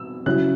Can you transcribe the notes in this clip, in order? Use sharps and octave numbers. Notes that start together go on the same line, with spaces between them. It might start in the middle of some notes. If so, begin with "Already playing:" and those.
Already playing: E6
C#3 F#3 C#4 E4 F#6